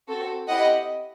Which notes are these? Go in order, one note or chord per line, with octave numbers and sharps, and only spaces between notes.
C4 F#4 A4
C4 E4 G4 D#5 F#5